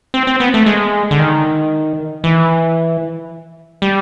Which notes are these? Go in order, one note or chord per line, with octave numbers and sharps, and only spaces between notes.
C4
C4
B3
A3
G#3
D3
D#3
E3
G3